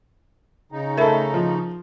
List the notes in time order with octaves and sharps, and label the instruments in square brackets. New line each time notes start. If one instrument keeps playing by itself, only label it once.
[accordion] C#3 D#4
[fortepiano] A3 A4 [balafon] A#4 E5 B5
[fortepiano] F3